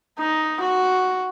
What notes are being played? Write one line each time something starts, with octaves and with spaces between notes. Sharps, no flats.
D#4
F#4